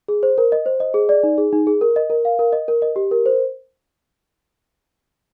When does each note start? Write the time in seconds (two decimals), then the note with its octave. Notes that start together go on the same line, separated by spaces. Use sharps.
0.08 G#4
0.23 C5
0.38 A#4
0.52 D#5
0.66 C5
0.80 D#5
0.94 G#4
1.09 D5
1.23 D#4
1.38 G#4
1.53 D#4
1.67 G#4
1.81 A#4
1.96 D#5
2.10 A#4
2.25 F5
2.39 A#4
2.53 D#5
2.68 A#4
2.82 D#5
2.96 G4
3.11 A#4
3.26 C5